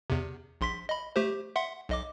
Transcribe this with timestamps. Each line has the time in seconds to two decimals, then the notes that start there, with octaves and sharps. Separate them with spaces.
0.10 E2 C3
0.61 A#1 C6 B6
0.89 D#5 B5
1.16 A3 G4 C5
1.56 E5 F#5 C6
1.89 B1 D#5 D6